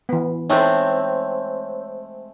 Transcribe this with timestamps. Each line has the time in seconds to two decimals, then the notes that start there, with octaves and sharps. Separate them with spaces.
0.09 E3 B3
0.50 G#3 A3 C4 D#4 A4 C#5